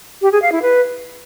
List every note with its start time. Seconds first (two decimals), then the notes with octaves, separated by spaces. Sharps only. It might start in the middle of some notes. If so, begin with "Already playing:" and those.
0.22 G4
0.32 G#4
0.42 F5
0.52 E4
0.62 B4